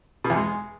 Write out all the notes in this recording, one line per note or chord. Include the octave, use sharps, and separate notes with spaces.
B2
E2
G#3